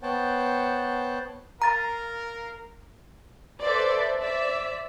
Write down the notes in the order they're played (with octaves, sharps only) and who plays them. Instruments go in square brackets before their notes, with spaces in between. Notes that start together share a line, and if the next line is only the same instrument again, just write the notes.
[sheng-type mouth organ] B3 C5 C#5 F#5 G5 A5
[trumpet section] A#4 F5 [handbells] A#5 A6
[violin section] A4 B4 C5 D5 E5
C5 D5 E5